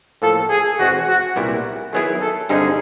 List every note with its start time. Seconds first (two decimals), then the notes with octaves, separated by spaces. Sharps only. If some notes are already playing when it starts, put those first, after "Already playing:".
0.22 A2 F3 A#3 A4
0.50 G#4
0.79 E2 B2 G#3 C4 F#4
1.08 F#4
1.36 C2 A#2 G3 B3 E4
1.93 D#3 F#3 B3 E4 G#4
2.21 A4
2.49 G2 D3 G3 C4 D#4 G#4